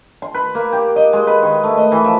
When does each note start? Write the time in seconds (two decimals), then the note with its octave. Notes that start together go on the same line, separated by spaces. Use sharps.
0.22 C6
0.34 B4
0.55 A#3
0.73 G4
0.96 D#5
1.13 G#3
1.27 B4
1.42 D#3
1.63 A3
1.77 D#5
1.92 E3
2.04 F3